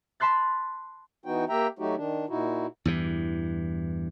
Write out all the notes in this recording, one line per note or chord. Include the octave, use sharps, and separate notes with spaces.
A5 B5 C6 F#6 A6
E3 B3 D#4 F#4 G5
A#3 G4 E5 G5 A#5
F#3 A3 D#4 F#4 G4
D#3 D4
A#2 D#4 E4 F#4
E2 G2 E3